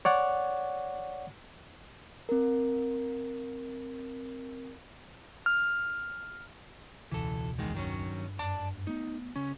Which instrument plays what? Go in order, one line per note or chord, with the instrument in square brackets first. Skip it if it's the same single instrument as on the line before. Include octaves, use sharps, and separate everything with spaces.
[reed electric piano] C#5 D5 F#5
[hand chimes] C4 A#4
[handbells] F6
[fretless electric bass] E1 C#2 [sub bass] B2 [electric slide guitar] E3 A4
[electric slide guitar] E2 D#3 G#3
[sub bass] G2 [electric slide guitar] D#3 F#3 C#4
[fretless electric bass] F#2 [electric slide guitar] D5 A5
[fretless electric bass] A3 B3 [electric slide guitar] D#4
[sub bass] C#3 [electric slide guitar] C#4